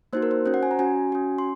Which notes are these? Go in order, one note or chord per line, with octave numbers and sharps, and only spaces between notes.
A#3 D#4 F#4 C5
A#4
C5
C#4 F#4 C5
F#5
G#5
A#5
C#4 F#4 G#5
C#4 F#4
C6